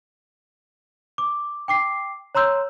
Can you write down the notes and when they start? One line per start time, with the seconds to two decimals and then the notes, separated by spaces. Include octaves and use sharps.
1.18 D6
1.68 G5 D6 C7
2.35 C#5 A#5 C6 E6 G6